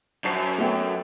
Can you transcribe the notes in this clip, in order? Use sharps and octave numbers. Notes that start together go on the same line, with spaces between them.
F#2 C5 A5 C7
A3 B3 G5